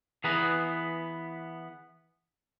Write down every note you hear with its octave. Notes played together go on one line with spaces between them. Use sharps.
E3 B3 G#4 B4 A#5